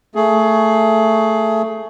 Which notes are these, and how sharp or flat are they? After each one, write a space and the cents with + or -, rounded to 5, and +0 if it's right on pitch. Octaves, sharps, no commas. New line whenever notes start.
A3 +15 G#4 +20